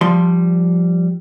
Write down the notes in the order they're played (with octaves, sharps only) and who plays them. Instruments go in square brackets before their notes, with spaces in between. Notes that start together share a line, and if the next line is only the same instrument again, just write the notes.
[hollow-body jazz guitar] F3 G3 C6